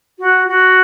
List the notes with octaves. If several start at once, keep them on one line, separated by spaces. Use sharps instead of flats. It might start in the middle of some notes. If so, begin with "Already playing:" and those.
F#4
F#4